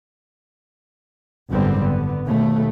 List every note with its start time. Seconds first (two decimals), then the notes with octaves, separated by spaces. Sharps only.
1.51 G#1 F#2 D3 G3 B3 C4
1.81 D3 B3
2.25 D#2 B2 A3